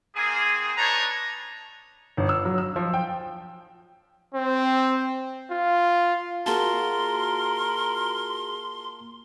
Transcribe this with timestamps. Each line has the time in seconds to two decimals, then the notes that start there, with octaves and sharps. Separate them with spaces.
0.16 A#3 C4 G#4
0.76 D4 D#4 B4 C#5 A5 A#5
2.17 G1
2.29 E6
2.45 F#3
2.58 E6
2.76 F3
2.94 G5
4.34 C4
5.51 F4
6.46 A#3 F4 F#4 G#4 A#4 A5 C6